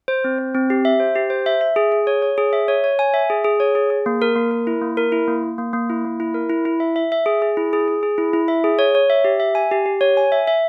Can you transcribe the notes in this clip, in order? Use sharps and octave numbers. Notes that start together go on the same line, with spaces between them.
C5
C4
C5
C4
G4
E5
C5
G4
C5
E5
E5
G#4
G#4
C#5
C#5
G#4
E5
C#5
C#5
G#5
E5
G#4
G#4
C#5
G#4
G#4
A#3
A#4
A#3
A#4
E4
A#3
A#4
E4
A#3
A#3
A#3
A#3
E4
A#3
E4
A#4
E4
E4
E5
E5
E5
G#4
G#4
E4
G#4
G#4
G#4
E4
E4
E5
G#4
C#5
C#5
E5
G4
E5
G#5
G4
G4
C#5
G#5
E5
E5